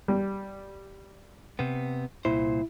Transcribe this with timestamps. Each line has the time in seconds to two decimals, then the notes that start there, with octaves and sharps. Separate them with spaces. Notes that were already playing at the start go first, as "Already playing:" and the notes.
0.08 G3
1.59 C3 B3
2.25 C2 A#2 E4 C5